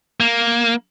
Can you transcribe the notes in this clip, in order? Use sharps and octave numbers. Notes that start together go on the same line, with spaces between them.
A#3